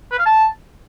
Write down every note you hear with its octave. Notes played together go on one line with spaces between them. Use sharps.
B4
F5
A5